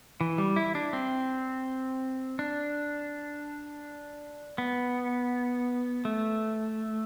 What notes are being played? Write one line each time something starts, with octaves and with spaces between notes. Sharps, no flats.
E3
G3
E4
D4
C4
D4
B3
A3